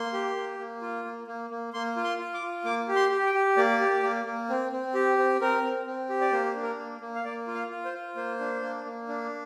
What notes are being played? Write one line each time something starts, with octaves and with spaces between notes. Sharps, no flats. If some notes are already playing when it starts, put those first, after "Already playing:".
Already playing: A#3 C6
G4
A#3
A#3
F4
A#3
A#3
A#3
A#3 C6
F4
C6
F4
D6
F4
A#3 D6
G4
C6
G4
G5
G4
A#3 D5
G4
A#3
A#3
C4
C4
G4
C4
C4 A#4
C4
C4
G4
D5
A#3 C5
D4
A#4
A#3
A#3
F5
A#3 D5
F4
F5
F4
C5
F4
A#3 C5
D4
A#3
A#3
D4